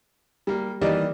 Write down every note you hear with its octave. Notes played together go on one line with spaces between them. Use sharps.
G3 A#3
D#3 E3 G3 A#3 D5 D#5